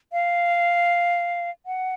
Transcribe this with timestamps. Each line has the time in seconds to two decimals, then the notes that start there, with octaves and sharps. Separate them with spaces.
0.12 F5
1.66 F#5